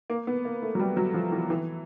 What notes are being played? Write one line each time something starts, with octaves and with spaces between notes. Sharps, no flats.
A#3
B3
A#3
A3
F#3
G3
F#3
F3
E3
E3